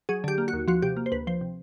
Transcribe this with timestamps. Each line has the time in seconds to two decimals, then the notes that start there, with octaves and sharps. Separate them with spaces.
0.09 F#3 G#4
0.24 D3 G4
0.38 A#3
0.48 F#4
0.53 D#2
0.68 F3 F#4
0.82 C3 G4
0.97 A#3
1.06 C5
1.12 D2 B4
1.27 F3 C5
1.41 C3